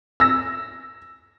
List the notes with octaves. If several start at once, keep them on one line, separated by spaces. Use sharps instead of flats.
E6 A#6